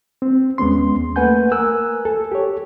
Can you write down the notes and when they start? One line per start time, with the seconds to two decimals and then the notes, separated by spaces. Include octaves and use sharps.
0.22 C4
0.58 D#2 G#3 B3 C#4 C6
1.16 A3 A#3 B4 F#5 G#5 G6
1.52 A#4 G#5 E6 F#6
2.05 A4
2.32 G4 A4 C#5